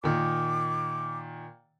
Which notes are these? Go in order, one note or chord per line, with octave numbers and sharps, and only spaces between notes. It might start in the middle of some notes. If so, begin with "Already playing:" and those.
A#2 D#3 D6